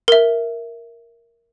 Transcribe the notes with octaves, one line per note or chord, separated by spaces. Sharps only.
A#4 E5